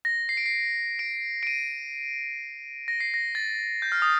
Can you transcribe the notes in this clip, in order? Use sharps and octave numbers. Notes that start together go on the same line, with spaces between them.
A#6
C7
D7
C7
D7
D7
D#7
A#6
C7
A#6
A6
G6
F6
D#6